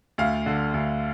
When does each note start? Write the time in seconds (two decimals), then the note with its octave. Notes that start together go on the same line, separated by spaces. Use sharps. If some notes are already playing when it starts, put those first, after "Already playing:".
0.18 D2 F5
0.46 D3
0.74 D2